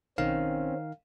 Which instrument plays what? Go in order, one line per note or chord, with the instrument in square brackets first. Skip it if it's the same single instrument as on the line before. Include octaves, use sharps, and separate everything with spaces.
[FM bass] B1 [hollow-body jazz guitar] D#3 [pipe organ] C4 C#4 [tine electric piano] F5